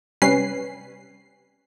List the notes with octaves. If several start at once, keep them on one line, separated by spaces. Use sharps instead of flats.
C3 G3 C#4 B4 C7